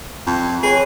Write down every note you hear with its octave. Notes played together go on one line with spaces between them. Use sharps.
F2
G#4 B4 C#5